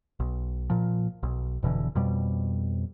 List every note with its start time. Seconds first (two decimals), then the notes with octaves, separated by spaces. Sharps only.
0.20 B1
0.70 A#2 F3
1.23 B1
1.63 F1 B2 D3 E3
1.95 F2 B2 G3